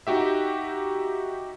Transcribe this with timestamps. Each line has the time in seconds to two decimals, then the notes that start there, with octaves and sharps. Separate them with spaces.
0.07 D#4 F#4 G4 E5